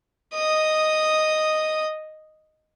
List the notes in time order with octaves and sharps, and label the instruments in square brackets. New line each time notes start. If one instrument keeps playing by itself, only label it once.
[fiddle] D#5 D#6